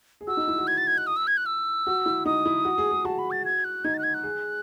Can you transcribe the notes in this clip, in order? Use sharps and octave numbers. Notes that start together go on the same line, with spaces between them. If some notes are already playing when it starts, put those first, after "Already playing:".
G#4
F#4 E6
D#4
E4
F#4
G#6
A6
G#6
F#6
D#6
E6
G#6
F#6
E6
F#4
E4
D#4 D#6
E4
F#4
G#4
G#4
F#4 A5
B5
A6
G#6
F#6
D#4 G#6
A6
F#6
G#6
F#6
G#4